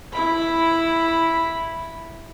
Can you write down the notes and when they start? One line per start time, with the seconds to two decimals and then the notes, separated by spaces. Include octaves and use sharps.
0.13 E4 B5